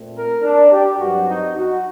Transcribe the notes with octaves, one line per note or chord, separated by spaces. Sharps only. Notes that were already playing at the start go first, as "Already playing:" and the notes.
Already playing: A#2 A3 C4
A#4
D4
G4
G2 F#3 C4 F#4
D#4
F#4